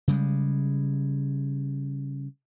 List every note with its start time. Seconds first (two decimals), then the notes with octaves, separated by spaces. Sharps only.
0.08 C#3 G3 G#3